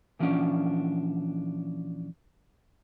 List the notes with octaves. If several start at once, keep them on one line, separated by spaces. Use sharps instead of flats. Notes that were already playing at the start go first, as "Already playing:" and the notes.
A#2 E3 F3 G3 C#4 D4